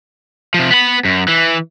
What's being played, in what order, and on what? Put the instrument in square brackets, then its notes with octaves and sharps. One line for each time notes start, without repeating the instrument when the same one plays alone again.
[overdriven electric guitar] C3 F3
B3 B5
F#2
E3